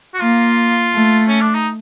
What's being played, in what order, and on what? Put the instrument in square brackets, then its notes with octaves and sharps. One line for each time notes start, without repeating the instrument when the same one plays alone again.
[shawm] F#4
[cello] A#3 [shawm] F4
[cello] A3
[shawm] C#4
D4
D#4